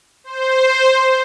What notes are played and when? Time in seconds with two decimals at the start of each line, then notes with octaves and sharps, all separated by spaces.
0.24 C5